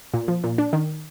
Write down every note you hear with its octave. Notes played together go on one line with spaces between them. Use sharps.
A#2
F3
A#2
D4
D#3